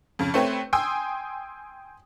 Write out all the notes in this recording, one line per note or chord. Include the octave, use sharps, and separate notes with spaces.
F2 C#3
A3 C4 B4 C#5
G5 G#5 C6 D#6 E6